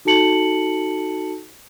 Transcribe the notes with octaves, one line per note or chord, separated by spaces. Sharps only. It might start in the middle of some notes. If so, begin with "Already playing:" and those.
D#4 F#4 A4 A5 C#7 F#7